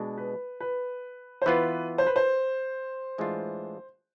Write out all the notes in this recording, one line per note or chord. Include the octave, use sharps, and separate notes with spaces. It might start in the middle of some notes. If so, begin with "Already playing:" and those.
Already playing: B2 G#3 D4
B4
B4
C5
E3 B3 F4 B4
C5
B4
C5
A2 E3 G#3 D4 F4